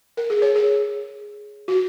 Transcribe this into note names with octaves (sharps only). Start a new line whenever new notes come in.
A#4
G#4
C#5
G#4
F#4